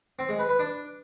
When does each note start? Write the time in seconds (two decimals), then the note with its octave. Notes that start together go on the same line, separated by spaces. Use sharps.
0.19 C4
0.29 G#3
0.39 B4
0.49 B4
0.59 D4